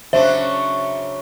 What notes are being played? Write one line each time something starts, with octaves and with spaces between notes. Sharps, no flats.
C#3 F#3 D4 C5 E5